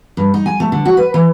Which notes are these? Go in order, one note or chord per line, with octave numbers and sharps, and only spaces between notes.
G2
D#4
G#5
A3
D3
F#4
B4
E3